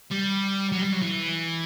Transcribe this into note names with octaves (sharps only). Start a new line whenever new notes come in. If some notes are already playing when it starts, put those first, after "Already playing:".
G3
F#3
G3
F#3
E3